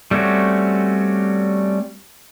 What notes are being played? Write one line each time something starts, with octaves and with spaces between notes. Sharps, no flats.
G3 A3 C4 C#4 F#4